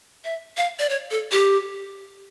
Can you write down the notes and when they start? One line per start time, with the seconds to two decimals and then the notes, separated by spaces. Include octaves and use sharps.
0.25 E5
0.57 F5
0.79 D5
0.89 C#5
1.11 A4
1.32 G4